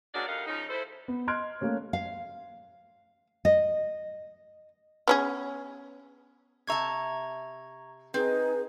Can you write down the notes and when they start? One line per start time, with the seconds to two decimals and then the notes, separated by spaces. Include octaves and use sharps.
0.14 G#3 A#3 C#4 D4 F#4 D5
0.27 D2 G3 D#4 A#4 F5 F#5
0.47 C#3 F3 C#4 D#4
0.69 E4 A4 C5
1.08 B3
1.28 D#5 C6 F6 F#6 G#6 D7
1.61 A3 A#3 C#4
1.93 F5
3.45 D#5
5.08 B3 C#4 G#4
6.67 C3 E5 A5 A#5 C#6 G#6
8.14 C4 D#4 G#4 B4